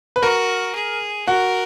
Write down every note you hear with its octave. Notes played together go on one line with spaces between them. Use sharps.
B4
F#4 A#4
G#4
F#4 A#4